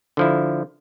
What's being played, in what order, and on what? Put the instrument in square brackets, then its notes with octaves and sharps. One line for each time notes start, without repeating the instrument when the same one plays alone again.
[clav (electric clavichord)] D3 F3 E4